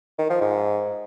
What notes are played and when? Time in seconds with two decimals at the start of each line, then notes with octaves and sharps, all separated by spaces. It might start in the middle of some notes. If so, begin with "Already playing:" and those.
0.19 D#3
0.30 F3
0.41 G#2